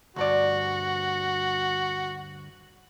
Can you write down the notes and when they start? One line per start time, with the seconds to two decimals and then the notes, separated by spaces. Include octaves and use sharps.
0.16 D2 G2 F#4 D5